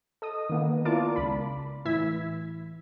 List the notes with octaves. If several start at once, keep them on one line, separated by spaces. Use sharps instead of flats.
A4 D#5 D#6
D#3 A#3 B3
E4 F4 A#4 D5 A5 D6
C#2 B5
A2 E3 E4 E6 G#6 B6